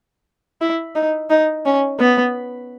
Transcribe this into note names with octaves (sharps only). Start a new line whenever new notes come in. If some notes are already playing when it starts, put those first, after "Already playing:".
E4
D#4
D#4
C#4
B3